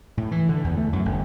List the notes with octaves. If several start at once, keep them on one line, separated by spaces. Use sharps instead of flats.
A2
E3
D3
E2
A3
F#2
G1